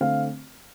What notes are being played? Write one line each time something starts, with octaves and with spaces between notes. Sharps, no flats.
D3 A3 C4 F5